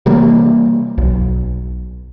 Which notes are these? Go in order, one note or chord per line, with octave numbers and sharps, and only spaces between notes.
C3 E3 G3 A#3
B1